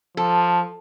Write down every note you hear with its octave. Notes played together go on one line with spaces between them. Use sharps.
F3 A4